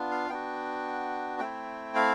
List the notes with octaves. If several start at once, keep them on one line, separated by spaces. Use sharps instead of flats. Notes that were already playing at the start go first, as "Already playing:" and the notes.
Already playing: B3 D4 F4
F5
B3 D4 F#4 G5
A3 C4 E4 G5
F5